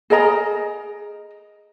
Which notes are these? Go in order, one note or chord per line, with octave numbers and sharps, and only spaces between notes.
G#4 A#4 D#5 A#5